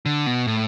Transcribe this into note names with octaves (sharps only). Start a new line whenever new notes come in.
D3
B2
A2